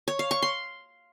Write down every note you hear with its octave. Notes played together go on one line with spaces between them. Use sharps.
C#5
F5
C#6
C6